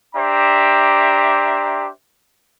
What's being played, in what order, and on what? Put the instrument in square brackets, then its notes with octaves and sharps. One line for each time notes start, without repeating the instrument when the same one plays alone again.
[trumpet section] D4 G4 C5 E5 A#5